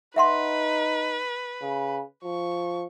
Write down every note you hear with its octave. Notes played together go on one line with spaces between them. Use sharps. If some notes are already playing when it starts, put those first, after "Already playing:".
D#4 B4 E5 F#5 C6
C#3
F3 C#6